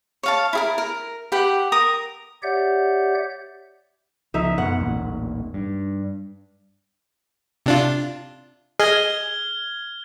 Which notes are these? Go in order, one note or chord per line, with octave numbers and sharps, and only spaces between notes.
C#5 F5 A5
E4 G#4 A#4
A#4
G4 B4 F#5 G5
A#4 A#5 D#6
G4 C#5 D5 E5 F#5 G6
C#2 F3 D#4 E5
F#2 B2 F#5
A1 D#2 A#2
G2
C3 D4 F4
G#4 D#5 F6 G#6 G7